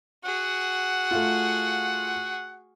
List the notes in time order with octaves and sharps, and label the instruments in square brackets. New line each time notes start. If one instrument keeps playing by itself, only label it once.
[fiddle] F#4 G#4 [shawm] F#5
[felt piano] A3 F4